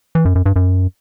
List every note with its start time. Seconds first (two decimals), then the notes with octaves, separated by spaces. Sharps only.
0.15 E3
0.25 F#2
0.35 F#2
0.46 G2
0.56 F#2